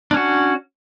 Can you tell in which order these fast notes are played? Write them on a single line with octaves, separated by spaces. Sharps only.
D4 C#4 F#4